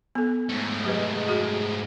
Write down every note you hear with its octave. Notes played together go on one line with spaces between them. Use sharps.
B3 A4
G#2 A3
F#3 G#3 G4 B4
F#4 G#4